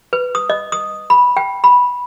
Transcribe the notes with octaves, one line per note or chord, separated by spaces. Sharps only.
B4
D#6
D#5
D#6
B5
G5
B5